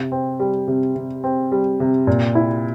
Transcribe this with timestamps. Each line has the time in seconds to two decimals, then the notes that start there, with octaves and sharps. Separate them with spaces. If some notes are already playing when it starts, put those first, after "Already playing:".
Already playing: C3
0.12 C4
0.40 G3
0.68 C3
0.95 C3
1.24 C4
1.52 G3
1.80 C3
2.07 A#2
2.35 E4